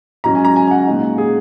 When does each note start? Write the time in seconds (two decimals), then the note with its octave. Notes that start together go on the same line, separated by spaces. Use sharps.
0.24 G#2 F#3 C#4 A#5
0.35 G#5
0.45 A#5
0.56 G#5
0.68 G#5
0.71 F#5
0.87 A#2 G#3 D#4
1.18 G#4